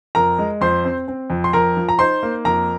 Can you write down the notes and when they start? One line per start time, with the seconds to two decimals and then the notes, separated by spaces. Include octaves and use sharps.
0.15 F2 A#4 A#5
0.39 G#3
0.61 F2 C5 C6
0.85 C4
1.08 C4
1.30 F2
1.44 C6
1.53 F2 A#4 A#5
1.77 F3
1.89 A#5
1.99 D#4 C5 C6
2.23 A#3
2.45 F2 A#4 A#5